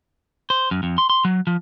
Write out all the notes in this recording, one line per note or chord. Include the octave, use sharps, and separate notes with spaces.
C5
F#2
F2
C6
C6
F#3
F3